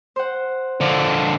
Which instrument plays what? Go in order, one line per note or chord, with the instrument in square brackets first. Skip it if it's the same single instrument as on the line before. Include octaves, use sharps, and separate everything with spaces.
[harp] C5 F#5
[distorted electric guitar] D3 F3 [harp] D5